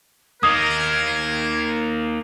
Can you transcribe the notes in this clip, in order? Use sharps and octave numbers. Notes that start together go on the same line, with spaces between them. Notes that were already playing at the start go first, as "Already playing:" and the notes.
A#3 D#4 A#4 D#6 G#6